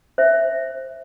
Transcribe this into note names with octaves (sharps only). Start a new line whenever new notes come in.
C5 E5